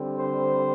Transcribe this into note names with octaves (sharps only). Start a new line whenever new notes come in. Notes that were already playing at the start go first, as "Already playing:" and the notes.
Already playing: D3 G3 C4
C5